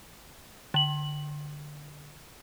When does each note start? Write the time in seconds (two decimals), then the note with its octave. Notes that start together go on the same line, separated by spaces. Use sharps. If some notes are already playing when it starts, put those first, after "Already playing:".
0.74 D3 F#7